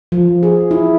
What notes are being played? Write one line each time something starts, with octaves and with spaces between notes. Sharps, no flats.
F3
G#4
E4